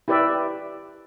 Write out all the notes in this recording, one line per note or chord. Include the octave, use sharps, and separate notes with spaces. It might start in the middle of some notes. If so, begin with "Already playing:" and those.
E4 G4 B4 D5 E5